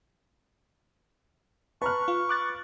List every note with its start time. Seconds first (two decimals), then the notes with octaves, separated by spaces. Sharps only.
1.82 B4 A5 A#5 C#6 F6 F#6
2.08 F4
2.29 D6 F#6 A6